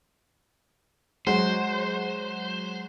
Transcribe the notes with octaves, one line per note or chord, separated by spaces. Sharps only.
F#3 G#3 F#4 C5